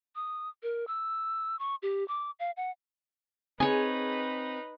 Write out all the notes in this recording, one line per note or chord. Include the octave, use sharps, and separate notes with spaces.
D#6
A#4
E6
C#6
G4
D6
F5
F#5
C4 D#4 G#4 B4 C#5 G#5